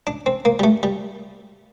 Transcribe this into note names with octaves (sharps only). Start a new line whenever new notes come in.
D4
C4
A#3
G3
A3
G3